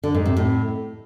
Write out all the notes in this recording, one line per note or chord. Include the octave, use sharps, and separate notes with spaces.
D3
G#2
C3
A2